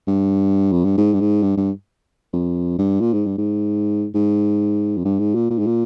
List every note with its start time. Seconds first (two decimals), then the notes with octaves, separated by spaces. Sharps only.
0.07 G2
0.72 F2
0.85 G2
0.98 G#2
1.14 G2
1.21 G#2
1.42 G2
1.57 G2
2.33 F2
2.78 G2
3.01 A#2
3.13 G#2
3.26 G2
3.38 G#2
4.14 G#2
4.97 F2
5.05 G2
5.19 G#2
5.35 A#2
5.50 A#2
5.59 G#2
5.66 A#2